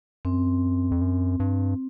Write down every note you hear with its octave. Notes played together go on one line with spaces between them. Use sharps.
F#2 C4
F2
F#2
G2